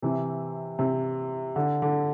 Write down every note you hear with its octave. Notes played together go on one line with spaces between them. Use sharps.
C3 E3
C3
D3
D3